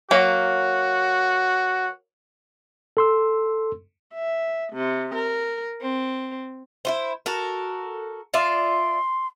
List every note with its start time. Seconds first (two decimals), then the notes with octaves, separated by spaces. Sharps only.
0.11 F#3 A#3 F#4
2.97 A4 C6 E6
4.14 E5
4.73 C3
5.15 A#4
5.81 C4
6.85 E4 F4 C5
7.26 F#4 A4 A#4
8.34 F4 D5 E5 C6